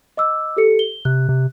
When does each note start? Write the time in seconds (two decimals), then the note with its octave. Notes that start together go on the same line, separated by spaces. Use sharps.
0.17 D#5 D6 E6
0.57 G4 A4 C#7
0.79 G7
1.05 C3 F#6
1.29 C3